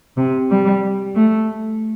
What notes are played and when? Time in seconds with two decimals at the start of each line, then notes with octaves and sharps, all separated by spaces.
0.16 C3
0.49 G3
1.14 A3